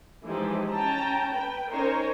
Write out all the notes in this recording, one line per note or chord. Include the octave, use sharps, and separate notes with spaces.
E3 F3 G#3 D#4 G4
C#4 G5 A5 A#5
B4 G5
C#4 D#4 A#4 C5 C#5 A#5